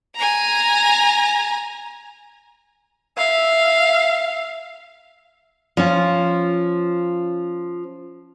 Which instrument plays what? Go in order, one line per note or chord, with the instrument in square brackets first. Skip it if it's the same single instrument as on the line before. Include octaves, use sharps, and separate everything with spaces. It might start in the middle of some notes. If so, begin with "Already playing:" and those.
[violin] G#5 A#5
[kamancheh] E5 F5
[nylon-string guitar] F3 C#4 F4